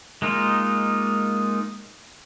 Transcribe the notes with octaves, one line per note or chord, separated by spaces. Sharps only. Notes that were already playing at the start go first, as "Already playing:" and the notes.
G#3 A#3 D#4 F4